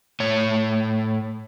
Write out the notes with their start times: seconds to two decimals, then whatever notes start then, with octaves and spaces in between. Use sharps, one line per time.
0.20 A2 C#5